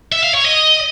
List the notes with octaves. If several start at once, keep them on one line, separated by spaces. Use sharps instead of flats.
E5
F5
C#5
D#5